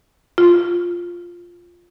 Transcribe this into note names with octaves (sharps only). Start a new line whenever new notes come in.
F4